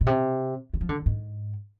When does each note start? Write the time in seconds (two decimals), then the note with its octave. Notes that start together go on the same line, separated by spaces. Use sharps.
0.01 B2
0.07 C3
0.74 D3
0.81 F3
0.89 D3
1.06 G#2